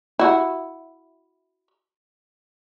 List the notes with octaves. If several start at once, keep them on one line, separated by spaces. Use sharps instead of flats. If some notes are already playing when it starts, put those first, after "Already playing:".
E4 F#4